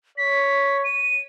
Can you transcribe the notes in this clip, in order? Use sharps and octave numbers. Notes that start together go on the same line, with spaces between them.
C#5 B6
D#7